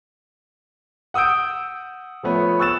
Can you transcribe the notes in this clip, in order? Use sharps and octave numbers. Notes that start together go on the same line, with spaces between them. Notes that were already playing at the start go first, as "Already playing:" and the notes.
F#5 D#6 E6 G6 D7
F3 A3 B3 C#5
C#6 E6 F#6 A6 E7